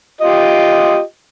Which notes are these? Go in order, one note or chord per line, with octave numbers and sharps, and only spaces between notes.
F4 G4 D#5